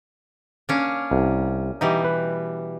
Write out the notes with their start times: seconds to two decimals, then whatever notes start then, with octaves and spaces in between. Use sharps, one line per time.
0.69 A#3 C#4 D4
1.11 C2
1.81 B2 E3 G3 D#4 G4
2.05 B4